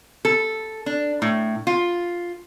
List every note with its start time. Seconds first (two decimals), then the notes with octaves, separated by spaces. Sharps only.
0.25 A4
0.86 D4
1.22 A2
1.67 F4